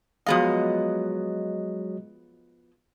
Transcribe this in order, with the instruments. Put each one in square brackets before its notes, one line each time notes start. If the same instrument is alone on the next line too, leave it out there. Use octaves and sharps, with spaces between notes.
[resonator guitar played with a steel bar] F3 B3 F5 [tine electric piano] F#3 G#3 D#5